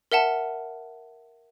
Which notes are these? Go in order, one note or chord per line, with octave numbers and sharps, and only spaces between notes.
A#4 E5 F#5 A5